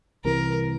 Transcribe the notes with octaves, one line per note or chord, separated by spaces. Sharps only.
C2 C3 E3 A#4